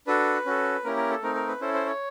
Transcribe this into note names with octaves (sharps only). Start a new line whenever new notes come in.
D4 F#4 A4 B4
C#4 F#4 A4
A#3 C#4 E4 G4 A#4
A#4
A4
A3 C4 D#4 A#4
A#4
B4
C#4 E4 A4 C5
C5
C#5